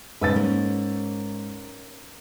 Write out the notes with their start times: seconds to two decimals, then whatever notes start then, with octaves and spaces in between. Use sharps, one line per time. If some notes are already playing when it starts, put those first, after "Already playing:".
0.21 G#2 C#3 B4 E6 A6
0.36 A#3 C#4 D#4